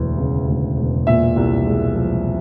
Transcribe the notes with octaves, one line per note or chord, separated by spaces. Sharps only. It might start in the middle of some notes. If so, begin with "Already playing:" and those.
Already playing: E1 D2 E3
C#3
D2
E1
A#2 E5
C2
G#3
F3